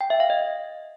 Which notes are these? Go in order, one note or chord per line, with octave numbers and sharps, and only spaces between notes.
G5
E5
F5
D#5